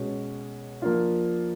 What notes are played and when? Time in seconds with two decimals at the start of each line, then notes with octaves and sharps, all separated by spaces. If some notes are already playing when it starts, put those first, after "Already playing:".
Already playing: B2 G#3 C#4
0.82 F3 A#3 D4 F4